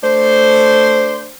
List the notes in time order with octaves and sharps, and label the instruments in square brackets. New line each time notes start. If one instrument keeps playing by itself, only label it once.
[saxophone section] A3 D4 C5